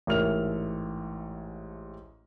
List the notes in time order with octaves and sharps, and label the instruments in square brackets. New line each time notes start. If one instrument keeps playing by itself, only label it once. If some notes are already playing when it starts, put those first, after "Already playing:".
[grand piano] A1 G#2 A#4 E5 F6 F7